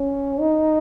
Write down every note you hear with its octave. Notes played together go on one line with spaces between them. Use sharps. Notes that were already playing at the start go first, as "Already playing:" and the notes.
Already playing: C#4
D#4